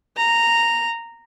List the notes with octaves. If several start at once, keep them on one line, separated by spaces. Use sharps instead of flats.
A#5